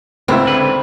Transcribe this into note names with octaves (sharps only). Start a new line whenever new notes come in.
C#2 G#2 C4 E4
D3 B4